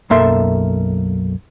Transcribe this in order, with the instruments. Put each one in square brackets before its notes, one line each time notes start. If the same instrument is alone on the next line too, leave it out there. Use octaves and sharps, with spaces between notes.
[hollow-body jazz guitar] B1 F#2 A#3 A4 E5 C6